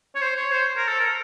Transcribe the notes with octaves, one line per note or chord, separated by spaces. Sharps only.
C#5
C5
C#5
C5
A#4
A4
A#4